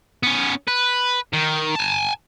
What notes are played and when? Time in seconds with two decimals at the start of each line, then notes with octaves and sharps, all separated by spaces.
0.23 B3 C#4
0.68 B4
1.33 D#3
1.75 G#5 A5